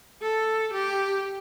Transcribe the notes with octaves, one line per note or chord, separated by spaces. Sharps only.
A4
G4